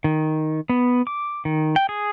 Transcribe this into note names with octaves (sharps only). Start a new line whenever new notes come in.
D#3
B3
D6
D#3
G5
G#4